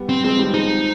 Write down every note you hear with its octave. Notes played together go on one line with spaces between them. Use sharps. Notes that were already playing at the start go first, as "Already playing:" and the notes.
Already playing: G3 B3
C4
F3 G#3 C4
D#3 G3
F3 G#3 D#4